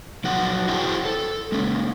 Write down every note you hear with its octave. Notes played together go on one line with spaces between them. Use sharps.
F3 F#3 D#4 F#5
E4 F#4 G#4 C5 G5 A5
A4
G#3 A#3 C#4